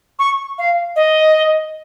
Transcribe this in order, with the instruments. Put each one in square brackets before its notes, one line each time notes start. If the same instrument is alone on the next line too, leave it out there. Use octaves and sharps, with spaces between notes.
[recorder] C#6
F5
D#5